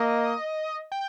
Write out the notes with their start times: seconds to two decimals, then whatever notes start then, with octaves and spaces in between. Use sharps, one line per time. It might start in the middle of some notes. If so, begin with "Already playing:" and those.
Already playing: A#3 D#5
0.92 G5